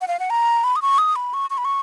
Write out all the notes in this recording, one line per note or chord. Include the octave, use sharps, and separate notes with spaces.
F#5
F5
F#5
A#5
B5
D#6
C#6
D#6
B5
C#6
C#6
B5
C#6